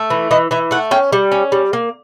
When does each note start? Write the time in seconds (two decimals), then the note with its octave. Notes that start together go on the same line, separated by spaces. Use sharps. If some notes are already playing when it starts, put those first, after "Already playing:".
Already playing: A3
0.10 E3
0.31 E3 D#5
0.51 E3 E5
0.71 A3 F#5
0.91 C#4 G5
1.13 G3
1.32 C#4
1.52 G3
1.73 A#3